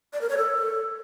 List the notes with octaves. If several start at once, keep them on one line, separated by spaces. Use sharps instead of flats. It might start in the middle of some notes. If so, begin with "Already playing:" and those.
D5
A#4
C#5
A4